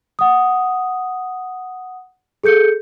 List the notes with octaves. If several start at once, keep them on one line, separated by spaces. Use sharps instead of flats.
F#5 D#6
G#4 A4 G6 C#7